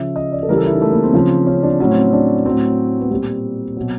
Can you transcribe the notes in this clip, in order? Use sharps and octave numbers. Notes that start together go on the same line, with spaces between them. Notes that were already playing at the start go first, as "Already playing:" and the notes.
Already playing: C#3 F3 E5
D#5
D5
A4
C#3 E3 G3 A#4
A4
E4
D#4
A3
A#3
C4
C#3 F3
C#4
D4
A2 F#3 C#4
C4
D4
A2 F#3 C4
B3
A#2 G3 C4
B2 F#3